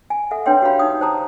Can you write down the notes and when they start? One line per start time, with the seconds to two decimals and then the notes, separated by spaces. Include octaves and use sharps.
0.10 G#5
0.31 A4 E5 F#5
0.46 D4 B4 C#5 G5 C6
0.62 F#4 G4 C#5 F5 B5
0.79 D#4 D#6
1.01 C5 A5 A#5 D#6